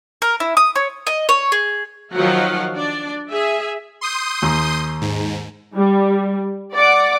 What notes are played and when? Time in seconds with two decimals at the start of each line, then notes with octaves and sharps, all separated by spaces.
0.22 A#4
0.40 E4
0.57 D#6
0.75 C#5
1.07 D#5
1.29 C#5
1.52 G#4
2.13 D#3 F3 F#3 F#4 F5 F#5
2.75 D4 D5
3.30 G#4 E5
4.01 C6 D#6 G6
4.42 D#2
5.01 G#2
5.75 G3
6.73 D5 F#5 D6